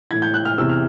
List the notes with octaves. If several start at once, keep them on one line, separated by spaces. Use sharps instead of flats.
A2 E3 G#6
G6
F#6
F6
E2 C3 E3 E6
F6